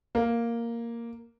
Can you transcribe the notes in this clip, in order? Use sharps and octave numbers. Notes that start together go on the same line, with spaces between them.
A#3